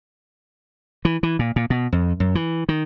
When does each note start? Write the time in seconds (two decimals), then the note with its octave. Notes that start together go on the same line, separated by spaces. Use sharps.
1.05 E3
1.23 E3
1.39 A#2
1.56 A#2
1.70 B2
1.92 F2
2.20 F#2
2.35 E3
2.69 D#3